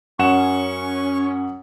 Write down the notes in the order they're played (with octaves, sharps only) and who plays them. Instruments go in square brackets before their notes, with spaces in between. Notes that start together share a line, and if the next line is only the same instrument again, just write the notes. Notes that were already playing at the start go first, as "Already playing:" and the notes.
[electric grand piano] F#2 F#5 E7 [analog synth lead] C#4 [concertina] C#6